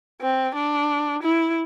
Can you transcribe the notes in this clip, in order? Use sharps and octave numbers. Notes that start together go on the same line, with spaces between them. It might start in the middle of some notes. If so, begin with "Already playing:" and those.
C4
D4
E4